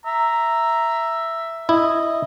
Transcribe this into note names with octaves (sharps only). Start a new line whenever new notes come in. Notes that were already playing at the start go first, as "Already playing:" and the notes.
E5 A#5
E4 D#5